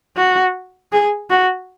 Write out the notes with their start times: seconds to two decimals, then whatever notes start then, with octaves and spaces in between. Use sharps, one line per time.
0.16 F#4
0.92 G#4
1.30 F#4